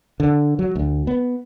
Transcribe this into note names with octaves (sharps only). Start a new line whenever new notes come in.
D3
F#3
D2
B3